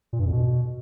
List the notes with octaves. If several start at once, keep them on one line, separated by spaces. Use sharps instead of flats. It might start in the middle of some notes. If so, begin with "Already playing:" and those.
A#2
G2
F2
B2